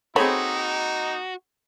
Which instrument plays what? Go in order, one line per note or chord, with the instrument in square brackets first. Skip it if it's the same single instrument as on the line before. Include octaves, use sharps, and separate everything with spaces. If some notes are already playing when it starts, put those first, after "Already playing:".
[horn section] A#3 D#4 [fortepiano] C4 G#4 B5 [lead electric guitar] F#4 [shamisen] A4 C#5